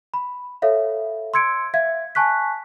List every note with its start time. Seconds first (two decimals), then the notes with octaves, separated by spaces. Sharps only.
0.14 B5
0.62 A4 C#5 E5 F5
1.34 C6 E6 G#6 C#7 D7
1.74 E5 F5 G#6
2.15 G#5 A5 C#6 F#6 B6